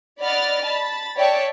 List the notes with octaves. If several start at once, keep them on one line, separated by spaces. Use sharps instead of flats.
D5 D#5 F#5 B5 F6 A6
A5 B5 A6
C#5 D5 E5 G5 A5 C#6